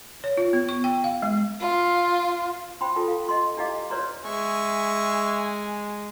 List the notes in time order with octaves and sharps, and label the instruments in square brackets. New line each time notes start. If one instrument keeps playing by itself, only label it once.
[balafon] C#5
F4
B3
C#6
G5
F5
G#3
[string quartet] F4
[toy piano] C5 G5 B5 C6
F4 A4 A5
F5
D#5 C6
D4 E4 G4 D#5 F5 D6
B4 C#5 D5 A#5 C6
[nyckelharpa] G#3 [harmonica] E5 C#6 [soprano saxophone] G#5